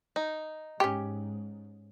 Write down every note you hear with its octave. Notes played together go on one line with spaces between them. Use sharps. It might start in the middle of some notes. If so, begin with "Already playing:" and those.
D#4
G#2 C#4 G4